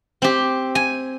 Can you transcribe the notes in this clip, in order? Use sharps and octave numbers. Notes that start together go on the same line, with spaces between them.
C4 G4
G#5